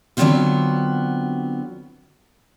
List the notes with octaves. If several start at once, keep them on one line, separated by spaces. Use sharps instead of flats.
D3 F#3 G#3 B3 C4 F4